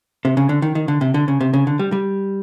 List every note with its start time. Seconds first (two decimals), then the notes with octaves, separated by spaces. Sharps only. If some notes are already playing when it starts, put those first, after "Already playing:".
0.25 C3
0.37 C#3
0.49 D3
0.62 D#3
0.75 D#3
0.88 D3
1.01 C3
1.14 D3
1.28 C#3
1.41 C3
1.54 C#3
1.67 D3
1.79 G3
1.92 G3